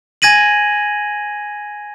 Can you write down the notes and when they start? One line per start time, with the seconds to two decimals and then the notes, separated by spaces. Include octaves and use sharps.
0.22 G#5 G#6 A#6 D#7 F#7